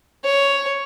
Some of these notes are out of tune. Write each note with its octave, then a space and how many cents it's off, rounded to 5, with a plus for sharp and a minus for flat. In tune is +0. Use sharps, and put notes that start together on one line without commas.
C#5 +5